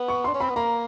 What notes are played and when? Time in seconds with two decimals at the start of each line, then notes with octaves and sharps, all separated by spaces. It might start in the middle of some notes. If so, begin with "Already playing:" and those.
Already playing: B3
0.08 C#6
0.24 D4 C6
0.34 C#4
0.40 C4 B5
0.50 B3
0.56 A#3 A#5